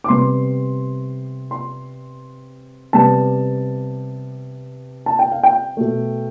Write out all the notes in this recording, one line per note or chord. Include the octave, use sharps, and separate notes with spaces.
D6
C3 G3 B3 C6
C6
C3 G3 B3 A5
A5
G5
F5
G5
B2 A3